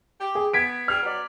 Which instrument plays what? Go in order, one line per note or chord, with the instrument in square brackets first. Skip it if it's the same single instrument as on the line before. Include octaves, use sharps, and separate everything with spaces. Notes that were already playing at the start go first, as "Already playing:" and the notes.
[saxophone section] G4
[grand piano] G#4
[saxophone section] B3 [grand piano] G#6 B6 D7
[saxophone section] G3 D4 G#4 [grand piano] F6
[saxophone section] F#3 B3 D5